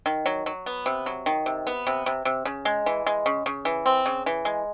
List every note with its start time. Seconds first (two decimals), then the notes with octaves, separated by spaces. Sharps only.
0.06 D#3
0.26 F#3
0.46 F#3
0.66 B3
0.86 C3
1.06 F#3
1.26 D#3
1.46 C3
1.67 B3
1.87 C3
2.06 C3
2.25 C3
2.45 C#3
2.65 G#3
2.86 E3
3.06 G#3
3.26 C#3
3.46 C#3
3.65 E3
3.86 C4
4.06 C#3
4.26 E3
4.45 G#3